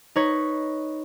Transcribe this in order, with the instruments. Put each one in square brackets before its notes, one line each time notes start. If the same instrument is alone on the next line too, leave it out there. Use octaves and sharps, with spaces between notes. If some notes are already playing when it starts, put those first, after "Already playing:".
[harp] D#4 B4 C#5